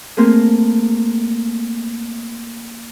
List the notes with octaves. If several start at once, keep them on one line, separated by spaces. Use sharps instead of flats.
A3 A#3 C4 G#4 A#4 C5